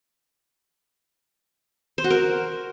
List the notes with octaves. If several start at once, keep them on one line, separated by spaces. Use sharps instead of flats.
C5
F#4
A#4